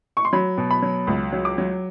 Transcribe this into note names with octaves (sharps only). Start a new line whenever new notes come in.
C#6
C6
F#3 B5
B2
B5
F#3
C#2
F#3
D6
F#3